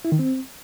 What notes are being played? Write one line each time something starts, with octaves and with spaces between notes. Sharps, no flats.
E4
D#3
C4